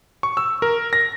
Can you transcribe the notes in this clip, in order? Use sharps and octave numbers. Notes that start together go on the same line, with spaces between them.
C#6
E6
A#4
A#6